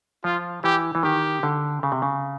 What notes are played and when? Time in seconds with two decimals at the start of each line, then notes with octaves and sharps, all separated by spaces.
0.24 F3 F4
0.64 E3 G4
0.95 E3
1.03 D#3 G4
1.43 D3
1.83 C#3
1.92 C3
2.02 C#3